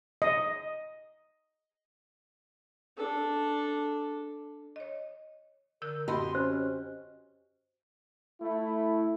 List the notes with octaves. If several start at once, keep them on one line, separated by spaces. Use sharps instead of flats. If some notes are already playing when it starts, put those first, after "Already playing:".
D#5
D4 A4
C#5 D#5
D3 A#4 E6 G6
F#2 C4 F#4 G4 D#5 B5 C6
C#4 C5
A3 E4